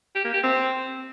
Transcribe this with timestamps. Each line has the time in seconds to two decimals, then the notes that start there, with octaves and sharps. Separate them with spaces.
0.15 G4
0.25 A#3
0.34 G4
0.43 C4